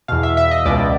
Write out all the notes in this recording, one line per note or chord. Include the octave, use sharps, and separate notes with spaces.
E2 B2 F5
E5
E5
D#5
C#2 B2 D5